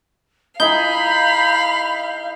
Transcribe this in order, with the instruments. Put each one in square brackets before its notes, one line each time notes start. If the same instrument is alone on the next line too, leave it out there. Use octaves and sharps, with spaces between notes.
[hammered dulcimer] D#4 E4 G#4 [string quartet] F5 [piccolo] B5 [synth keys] G6